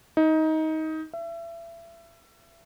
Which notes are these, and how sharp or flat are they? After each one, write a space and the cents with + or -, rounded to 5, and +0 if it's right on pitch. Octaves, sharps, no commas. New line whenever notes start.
D#4 +20
E5 +30